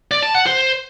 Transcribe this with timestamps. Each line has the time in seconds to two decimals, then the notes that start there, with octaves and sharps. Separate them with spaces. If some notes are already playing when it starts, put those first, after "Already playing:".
0.11 D5
0.23 A5
0.35 F#5
0.46 C5